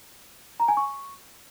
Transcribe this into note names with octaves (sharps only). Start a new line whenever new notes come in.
A#5
G#5
C#6